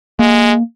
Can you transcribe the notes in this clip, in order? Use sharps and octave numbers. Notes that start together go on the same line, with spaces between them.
G#3 A#3